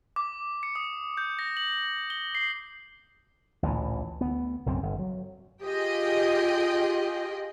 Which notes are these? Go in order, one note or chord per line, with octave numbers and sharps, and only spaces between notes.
D6
C#7
D#6
G6
A#6
F#7
G7
C7
A1 D2 A#2 E3
D2 B3
B1 F#2 C#3 C4
G1
F#3
F4 G4 G#4 D#5 G5